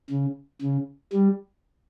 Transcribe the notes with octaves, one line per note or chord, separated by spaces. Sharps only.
C#3
C#3
G3